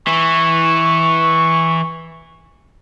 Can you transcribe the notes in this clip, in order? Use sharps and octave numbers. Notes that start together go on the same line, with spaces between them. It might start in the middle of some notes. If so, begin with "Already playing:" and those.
E3 C#6